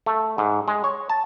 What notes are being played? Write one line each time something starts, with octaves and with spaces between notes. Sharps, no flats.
A3
G#2
G#3
C#5
A5